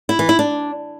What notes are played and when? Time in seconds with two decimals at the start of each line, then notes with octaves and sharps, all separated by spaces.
0.09 E4
0.19 E3
0.29 E4
0.39 D4